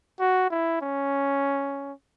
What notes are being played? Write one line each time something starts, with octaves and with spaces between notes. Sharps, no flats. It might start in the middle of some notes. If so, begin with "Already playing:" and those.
F#4
E4
C#4